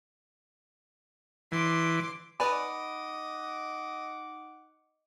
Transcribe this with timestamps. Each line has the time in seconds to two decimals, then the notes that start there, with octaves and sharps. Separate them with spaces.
1.52 E3 C6 D6
2.40 D#4 B4 D5 D#5 F#5 G#5 B5 D6